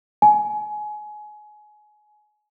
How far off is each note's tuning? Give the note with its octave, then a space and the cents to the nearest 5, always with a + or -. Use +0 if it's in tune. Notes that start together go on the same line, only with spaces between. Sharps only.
G#5 +25